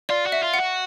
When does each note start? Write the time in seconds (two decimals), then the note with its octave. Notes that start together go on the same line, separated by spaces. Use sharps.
0.09 F4 D5
0.26 F#4
0.32 E5
0.43 F4
0.54 F#5
0.60 F#4